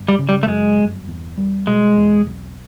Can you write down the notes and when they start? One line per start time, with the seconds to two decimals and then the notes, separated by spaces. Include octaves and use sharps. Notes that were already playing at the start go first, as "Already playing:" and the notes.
Already playing: G1
0.08 G3
0.19 C#3
0.29 G3
0.43 A3
0.48 F#2 G#3
0.79 G1
1.07 E2
1.38 G3
1.67 B2 G#3
1.97 E2
2.27 B1